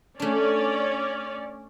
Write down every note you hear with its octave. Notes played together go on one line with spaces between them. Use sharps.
A3 C#4 D4 D5